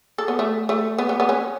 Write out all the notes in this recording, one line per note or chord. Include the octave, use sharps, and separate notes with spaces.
A4
B3
A3
A3
B3
B3
B3
C#4